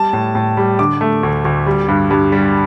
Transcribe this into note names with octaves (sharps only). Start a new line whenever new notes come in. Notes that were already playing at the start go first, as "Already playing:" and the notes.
Already playing: G3 A5
A2
A2
G3
D3 D6
A3
D2
D2
G3
G2
G2
G3